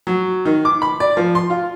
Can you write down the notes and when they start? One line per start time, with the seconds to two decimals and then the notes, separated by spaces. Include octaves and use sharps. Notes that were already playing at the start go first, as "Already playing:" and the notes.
0.07 F#3
0.45 D#3
0.65 D6
0.82 B5
1.00 D5
1.17 F3
1.35 C6
1.50 F4